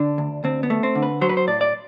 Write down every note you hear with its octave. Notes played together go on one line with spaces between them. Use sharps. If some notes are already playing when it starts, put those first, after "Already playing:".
Already playing: D3 D4
D2
D2 C4
B3
A3
C4
D3
B4
F#3 C5
B4
C5
A2 D5
D5